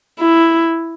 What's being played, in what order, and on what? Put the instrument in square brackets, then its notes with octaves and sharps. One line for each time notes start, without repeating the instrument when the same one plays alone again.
[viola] E4